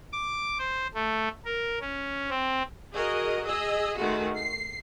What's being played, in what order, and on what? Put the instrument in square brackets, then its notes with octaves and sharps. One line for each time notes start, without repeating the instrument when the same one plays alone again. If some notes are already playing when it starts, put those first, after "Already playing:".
[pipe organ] D6
C5
A3
A#4
C#4
C4
[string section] F#4 G#4 A#4 D#5
G#4 D#5 E6
D#3 G#3 A3 F#4
C7